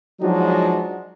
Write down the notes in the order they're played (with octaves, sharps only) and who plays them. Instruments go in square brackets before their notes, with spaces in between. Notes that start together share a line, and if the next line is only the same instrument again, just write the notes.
[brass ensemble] F3 F#3 G#3 D4 D#4 F#4